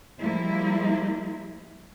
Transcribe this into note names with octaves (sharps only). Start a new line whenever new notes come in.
F3 G3 G#3 A#3 E4